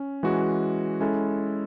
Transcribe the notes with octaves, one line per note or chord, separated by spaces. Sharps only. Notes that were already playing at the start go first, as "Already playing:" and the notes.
Already playing: C#4
E3 G#3 C#4 F#4
G#3 C#4 E4 A4